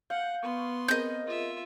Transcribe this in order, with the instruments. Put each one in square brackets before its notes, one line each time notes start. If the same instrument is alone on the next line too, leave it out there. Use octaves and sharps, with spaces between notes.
[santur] F5 [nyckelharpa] F#5 [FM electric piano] G6
[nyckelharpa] B3 C6 [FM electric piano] C#6
[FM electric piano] C4 G#4 A#4 [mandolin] D#5 G6
[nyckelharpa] F4 E5